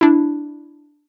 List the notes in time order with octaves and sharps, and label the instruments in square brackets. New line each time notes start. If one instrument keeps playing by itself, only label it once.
[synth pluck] D4 E4